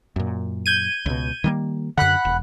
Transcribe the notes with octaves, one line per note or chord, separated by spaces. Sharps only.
F#2 A#2
G6 G#6 D#7
C#2 B2
D#3 G3 A#3
F#2 D3 F#5 B5 F#6
E1